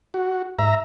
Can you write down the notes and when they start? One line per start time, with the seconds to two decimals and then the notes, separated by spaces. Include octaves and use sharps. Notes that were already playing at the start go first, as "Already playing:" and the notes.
0.14 F#4
0.59 G#2 E5 A#5